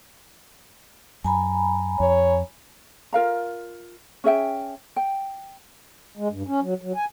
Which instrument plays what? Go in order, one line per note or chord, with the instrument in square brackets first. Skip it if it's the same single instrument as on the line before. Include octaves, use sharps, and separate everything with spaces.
[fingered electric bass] F#2 [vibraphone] G#5 A#5 B5
[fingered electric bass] F2 [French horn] C#5
[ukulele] F4 A#4 F5 A#5
C#4 G#4 E5 G5
G5
[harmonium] G#3
G2
C#4
F#3
F#3
G#5